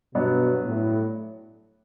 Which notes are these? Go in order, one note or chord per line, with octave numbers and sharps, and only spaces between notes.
G2 B2 F#3 B3 D4
A2